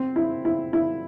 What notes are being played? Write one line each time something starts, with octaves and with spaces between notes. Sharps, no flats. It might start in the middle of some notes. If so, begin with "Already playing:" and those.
Already playing: C4
E4
E4
E4